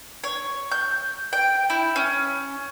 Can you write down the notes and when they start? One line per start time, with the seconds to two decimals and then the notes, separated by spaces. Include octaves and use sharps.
0.24 C#5
0.71 G6
1.33 G5
1.70 E4
1.96 C#4